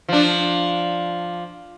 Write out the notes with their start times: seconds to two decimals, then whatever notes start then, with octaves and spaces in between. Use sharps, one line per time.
0.09 F3 D4